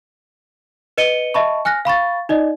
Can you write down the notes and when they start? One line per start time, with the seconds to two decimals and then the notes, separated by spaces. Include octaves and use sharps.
0.98 B4 D#5 C#7 D#7 G7
1.34 D#5 E5 A5 B5 C#6
1.65 G#5 F6 F#6 A#6
1.85 F5 B5 C#6 A6
2.29 D#4 D5 D#5